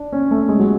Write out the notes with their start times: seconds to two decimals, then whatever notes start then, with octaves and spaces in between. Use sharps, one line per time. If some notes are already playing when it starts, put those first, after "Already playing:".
Already playing: D4
0.12 C#4
0.31 A3
0.49 G#3
0.60 F#3